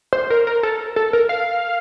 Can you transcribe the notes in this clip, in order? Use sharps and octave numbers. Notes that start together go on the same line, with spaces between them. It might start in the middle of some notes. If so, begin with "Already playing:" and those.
C5
A#4
A#4
A4
A4
A#4
F5